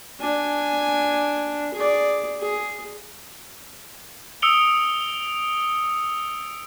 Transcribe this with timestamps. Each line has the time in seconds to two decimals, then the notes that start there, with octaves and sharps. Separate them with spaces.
0.20 D4 G#5
1.74 G#4 D5
2.41 G#4
4.42 D#6 E6 C#7 D7 F7 G7